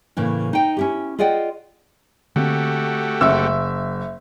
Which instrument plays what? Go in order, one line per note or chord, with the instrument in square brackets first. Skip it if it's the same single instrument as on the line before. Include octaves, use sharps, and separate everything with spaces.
[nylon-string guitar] A2 C#3 E3 A#3
D#4 G5
C#4 E4 G4
F4 G#4 D5 D#5 F#5 G5
[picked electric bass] D3 A#3 C4 [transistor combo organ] A3 F#4 G4
[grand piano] F#1 [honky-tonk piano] E5 E6